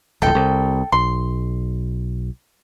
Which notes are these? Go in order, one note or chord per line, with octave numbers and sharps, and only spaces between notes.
D1 A#1 A4 G5
C2
B1 C6